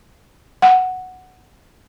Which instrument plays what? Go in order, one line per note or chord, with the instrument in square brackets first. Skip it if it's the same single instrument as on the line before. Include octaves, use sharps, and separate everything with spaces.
[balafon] F#5